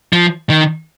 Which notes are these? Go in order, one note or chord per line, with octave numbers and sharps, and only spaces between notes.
F3
D#3